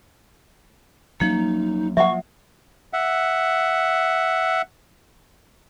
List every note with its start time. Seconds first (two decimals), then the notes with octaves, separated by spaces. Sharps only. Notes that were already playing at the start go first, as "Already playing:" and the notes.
1.20 D2 F3 F#3 A#3 C#4 D#4
1.97 F3 F#3 E5 F#5 C#6
2.93 E5 F#5